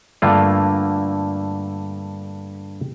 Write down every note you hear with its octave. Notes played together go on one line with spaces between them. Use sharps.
G2 D3 A3 A#3 F4